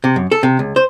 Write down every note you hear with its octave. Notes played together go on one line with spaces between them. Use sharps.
C3
F#2
A4
C3
C#2
C5